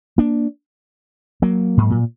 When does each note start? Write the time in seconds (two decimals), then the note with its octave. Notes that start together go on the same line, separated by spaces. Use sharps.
0.18 A#3 D4
1.42 F#3 A#3
1.77 G#2
1.90 A#2